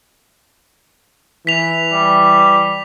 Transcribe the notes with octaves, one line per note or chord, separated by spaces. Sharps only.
E3 B6 F7
G3